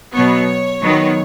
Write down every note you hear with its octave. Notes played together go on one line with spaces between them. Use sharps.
B2 F#3 B3 C#5
D#3 F#3 B3